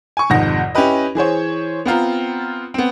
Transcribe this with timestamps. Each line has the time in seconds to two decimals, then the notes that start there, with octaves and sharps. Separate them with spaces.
0.17 G#5 C#6
0.30 G#1 F2 G#2 C3 F#5 A#6
0.75 C#4 E4 G4 B4 D#5
1.15 E3 G#4 C5 C#5
1.85 B3 C4 F4 A#5
2.74 B3 C4